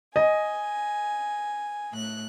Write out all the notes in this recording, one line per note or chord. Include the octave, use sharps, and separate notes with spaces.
D#5 G#5
A2 F#6